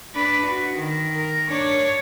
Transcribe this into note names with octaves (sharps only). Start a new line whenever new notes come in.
D4 B4
F#4
D#3
A#4
D4 C#5